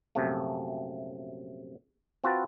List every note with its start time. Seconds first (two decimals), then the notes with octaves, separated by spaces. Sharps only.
0.15 A#1 F#2 C3 A3
2.24 C4 F4 F#4 B4 A5